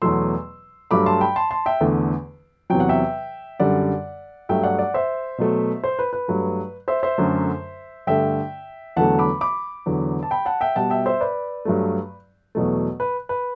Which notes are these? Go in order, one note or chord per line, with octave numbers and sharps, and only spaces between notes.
E2 B2 F#3 A3 C6 E6
G2 F#3 A3 B5 D6
A5 C6
G5 B5
A5 C6
A5 C6
E5 G5
E2 D3 A3
E2 C3 F#3 G5
F#5
E5 G5
F#2 D3 G3 D5 F#5
G2 F#3 A3 E5 G5
D5 F#5
D5 F#5
C5 E5
B2 F#3 A3
C5
B4
B4
G2 F#3 A3
C5 E5
C5 E5
F#2 D3 F#3 A3
G2 D3 A3 E5 G5
E2 D3 F#3 A3 F#5 A5
B5 D6
B5 D6
E2 D3 F#3
A5
G5 B5
F#5 A5
E5 G5
B2 G3 F#5 A5
E5 G5
C5 E5
B4 D5
G2 F#3 A3
E2 B2 F#3 A3
B4
B4